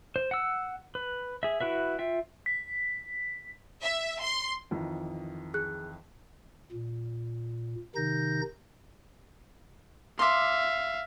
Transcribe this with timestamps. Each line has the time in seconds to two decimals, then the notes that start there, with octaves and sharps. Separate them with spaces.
0.16 C5
0.31 F#5 E6
0.95 B4
1.43 G#4 E5
1.61 E4 F#4 B4 E5
1.99 F4 E5 G5
2.46 B6
3.81 E5
4.22 C6
4.71 F2 D#3 E3
5.54 G#4 F#6
6.72 A#2
7.96 C3 D#3 D#4 G6 A#6
10.19 E5 F5 C6 D6